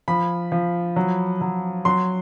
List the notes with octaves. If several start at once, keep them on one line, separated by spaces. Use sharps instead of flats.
F3 B5
F3
F#3
F#3
F#3 C6